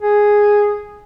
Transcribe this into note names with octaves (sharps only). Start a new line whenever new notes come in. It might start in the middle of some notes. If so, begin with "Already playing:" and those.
G#4